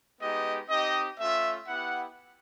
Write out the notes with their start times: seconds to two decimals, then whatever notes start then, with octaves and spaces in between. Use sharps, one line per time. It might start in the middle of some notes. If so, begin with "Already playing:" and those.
0.21 G#3 B3 D#4 G4 D#5
0.69 C4 D#4 G4 D#5
1.19 A3 C#4 F4 E5
1.68 B3 E4 G4 F#5